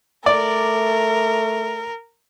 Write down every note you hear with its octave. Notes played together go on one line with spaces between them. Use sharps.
A3 A#4 D5